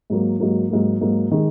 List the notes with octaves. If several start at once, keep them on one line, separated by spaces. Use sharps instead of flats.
G#2 F#3 A#3
G#2 F#3 A#3
G#2 F#3 A#3
G#2 F#3 A#3
D#3 G#3